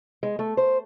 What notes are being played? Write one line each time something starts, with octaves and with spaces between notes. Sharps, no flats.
G#3
A3
C5